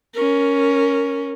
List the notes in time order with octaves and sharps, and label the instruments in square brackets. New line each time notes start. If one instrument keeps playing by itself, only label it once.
[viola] C#4 A#4